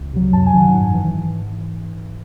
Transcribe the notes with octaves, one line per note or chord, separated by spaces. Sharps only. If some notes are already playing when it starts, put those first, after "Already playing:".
Already playing: C#2
C3 F#3
F#2 A5
G#5
D#3 F#3
F#5
G#2
E3